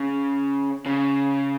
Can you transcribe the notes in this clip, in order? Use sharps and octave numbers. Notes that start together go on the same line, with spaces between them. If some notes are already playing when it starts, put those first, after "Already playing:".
Already playing: C#3
C#3